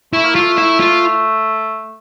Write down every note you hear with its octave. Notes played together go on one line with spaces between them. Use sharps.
A3 E4
A#3
A3 F4
E4
F4